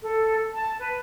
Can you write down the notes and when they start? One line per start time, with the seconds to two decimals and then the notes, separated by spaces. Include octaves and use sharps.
0.03 A4
0.54 A5
0.79 B4